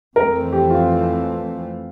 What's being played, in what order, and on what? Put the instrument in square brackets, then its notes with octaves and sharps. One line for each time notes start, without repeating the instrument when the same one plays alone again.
[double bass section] F2 E3 A3 C4 [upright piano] A#4
[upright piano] G4
F4